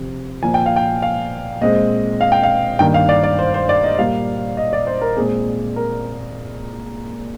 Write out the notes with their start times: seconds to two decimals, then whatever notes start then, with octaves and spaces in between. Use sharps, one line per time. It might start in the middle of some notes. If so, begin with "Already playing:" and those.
Already playing: C3 F3 C4
0.43 A#2 F3 A#3 G#5
0.54 G5
0.66 F5
0.76 G5
1.02 F5
1.61 A#2 G#3 C4 D#5
2.21 F5
2.32 G5
2.43 F5
2.79 G2 D#3 A#3 G5
2.94 F5
3.09 D5
3.24 D5
3.39 C5
3.54 C5
3.69 D5
3.84 D#5
3.98 A#2 G3 A#3 F5
4.57 D#5
4.73 D5
4.87 C5
5.02 A#4
5.16 A#2 G#3 C4 G#4
5.76 A#4